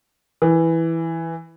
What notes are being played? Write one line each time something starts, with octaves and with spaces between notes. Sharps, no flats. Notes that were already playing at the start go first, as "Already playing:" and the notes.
E3